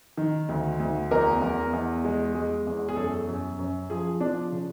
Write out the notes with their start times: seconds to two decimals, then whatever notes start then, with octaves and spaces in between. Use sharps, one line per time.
0.17 D#3
0.49 D2
0.80 D2
1.11 E2 A#4
1.42 E2
1.73 E2
2.05 G#3
2.35 G#3
2.67 E2
2.89 G#4
2.96 F#2 A4
3.28 F#2
3.59 F#2
3.90 F3 G#4
4.20 F3 D4
4.52 C#3